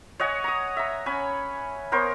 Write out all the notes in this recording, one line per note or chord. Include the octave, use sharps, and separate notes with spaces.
C#5 D#5 F#5 G#5
A#5 D#6
E5 A#5
C#4 G#5 B5
B3 A#4 C5 C#5